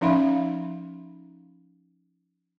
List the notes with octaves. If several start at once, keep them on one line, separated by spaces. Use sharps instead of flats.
F3 C#4 D#4 E5 F5 B5